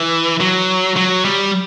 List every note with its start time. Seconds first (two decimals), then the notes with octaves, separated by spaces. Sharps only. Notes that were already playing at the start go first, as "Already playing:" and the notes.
Already playing: E3
0.41 F#3
0.96 F#3
1.25 G3